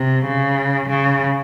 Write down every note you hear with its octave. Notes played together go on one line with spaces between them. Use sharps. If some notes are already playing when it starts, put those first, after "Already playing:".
Already playing: C3
C#3
C#3